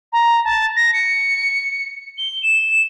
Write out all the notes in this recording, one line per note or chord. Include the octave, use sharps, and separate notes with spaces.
A#5
A5
A#6
C#7
G7
E7